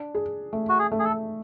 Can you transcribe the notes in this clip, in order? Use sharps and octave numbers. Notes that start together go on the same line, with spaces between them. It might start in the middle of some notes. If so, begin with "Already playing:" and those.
Already playing: D4
G#4
A3
F#4
G#4
A3
G#4
A4